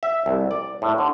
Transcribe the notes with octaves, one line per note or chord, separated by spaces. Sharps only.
E5
C2
D5
A2
D3